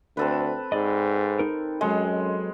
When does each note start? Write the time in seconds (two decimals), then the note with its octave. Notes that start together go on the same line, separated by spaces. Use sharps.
0.17 D2 C4 A4 B4
0.72 G#2 D5 D#5
1.39 D#4 A#4
1.81 F#2 F#3 G#3 A4 D#5